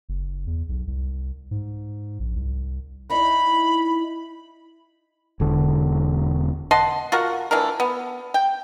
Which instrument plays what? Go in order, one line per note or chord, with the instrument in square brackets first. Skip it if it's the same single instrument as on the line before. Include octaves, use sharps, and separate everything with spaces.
[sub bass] F#1
E2
B1
C2
G#2
A#1
C2
[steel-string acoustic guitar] D#4 E4 [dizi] B5
[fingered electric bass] E1 D3
[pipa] D#5 F#5 A5 C6
F4 F#4 A#4 F#5
E3 A3 D4 A#4
B3
G5